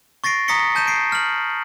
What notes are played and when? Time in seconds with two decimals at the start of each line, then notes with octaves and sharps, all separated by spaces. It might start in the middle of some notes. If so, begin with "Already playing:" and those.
0.24 C#6 A6 A#6 C7 D7
0.48 A#5 D#6 A#6 B6 C#7 G7
0.75 A5 G6 D#7 E7
0.87 C7 D7
1.12 F6 F#7